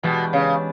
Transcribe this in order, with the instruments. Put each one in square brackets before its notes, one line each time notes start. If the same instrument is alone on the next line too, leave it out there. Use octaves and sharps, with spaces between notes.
[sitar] B2 [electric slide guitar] E3 G#3 B3 D4 G4
[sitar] C#3